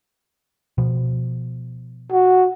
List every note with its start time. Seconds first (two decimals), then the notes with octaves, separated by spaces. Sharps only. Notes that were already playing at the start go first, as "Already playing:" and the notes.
0.78 B2 F3
2.12 F#4